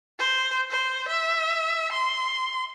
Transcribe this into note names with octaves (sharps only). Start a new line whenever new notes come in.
C5
C5
E5
C6